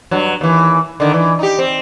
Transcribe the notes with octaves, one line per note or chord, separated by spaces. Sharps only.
G2 F#3
D#2 E3
D3 D#3
E3
D#4 G4
C4